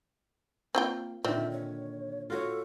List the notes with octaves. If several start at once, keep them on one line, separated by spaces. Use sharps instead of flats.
A#3 C4 F4 G5
A#2 D3 D#3 C4 E5
C#5
F4 F#4 A4 C#5